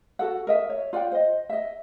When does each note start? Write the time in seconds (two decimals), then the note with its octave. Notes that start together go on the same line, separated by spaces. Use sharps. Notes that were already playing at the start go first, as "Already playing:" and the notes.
0.19 F#4 A4 F#5
0.47 A#4 D#5 E5
0.70 C#5
0.93 F4 D5 F#5 G5
1.12 C5 D#5
1.50 D#5 E5